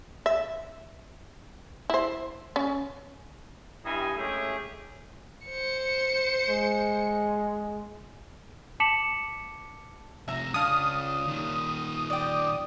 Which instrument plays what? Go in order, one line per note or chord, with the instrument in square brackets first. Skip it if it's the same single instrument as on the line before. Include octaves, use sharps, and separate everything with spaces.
[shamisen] E5
E4 C5
C#4
[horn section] G2 E4 G4 D#5 G#5
G#3 A3 C#4 E4 G4 G#4
[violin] C5 C#7
[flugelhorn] G#3
[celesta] A5 D6 B6 C#7 E7 F#7
[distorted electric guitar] F2 C3 [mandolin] E5 A#5
[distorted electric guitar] C#2 [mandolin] C#4 D4 F5 [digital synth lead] D#6
[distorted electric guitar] A#2 D#3
[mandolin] D5 G5